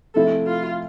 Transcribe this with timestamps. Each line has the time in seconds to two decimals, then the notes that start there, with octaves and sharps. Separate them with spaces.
0.14 C3 F3 A3 E4 A4
0.47 F4